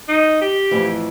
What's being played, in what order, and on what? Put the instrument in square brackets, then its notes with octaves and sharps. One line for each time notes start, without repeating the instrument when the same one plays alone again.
[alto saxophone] D#4
G4
[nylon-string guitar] F2 A2 E3